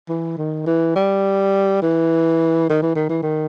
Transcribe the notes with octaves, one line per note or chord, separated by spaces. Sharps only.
E3
D#3
E3
G3
E3
D#3
E3
D#3
E3
D#3